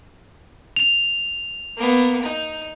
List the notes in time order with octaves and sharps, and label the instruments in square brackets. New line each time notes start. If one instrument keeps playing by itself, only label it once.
[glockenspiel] F7
[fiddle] A#3 B3
D#4